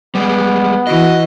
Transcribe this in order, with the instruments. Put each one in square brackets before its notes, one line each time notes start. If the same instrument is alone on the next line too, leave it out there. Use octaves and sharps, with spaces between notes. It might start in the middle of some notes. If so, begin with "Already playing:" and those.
[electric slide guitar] G3 G#3 [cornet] B3
[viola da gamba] E3 [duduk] F#4 [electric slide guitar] D#5